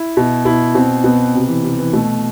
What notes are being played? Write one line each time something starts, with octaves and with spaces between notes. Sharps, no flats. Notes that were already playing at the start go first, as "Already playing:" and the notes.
Already playing: E4
B2
B2 E4
B2 C4
B2 B3
C3
E3
C3
E3
B2 A3